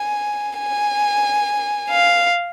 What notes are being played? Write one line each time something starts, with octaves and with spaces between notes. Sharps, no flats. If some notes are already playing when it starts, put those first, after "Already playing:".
Already playing: G#5
G#5
F5